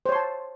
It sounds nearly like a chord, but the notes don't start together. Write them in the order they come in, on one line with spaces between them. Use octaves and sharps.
C5 C#5 C6 A5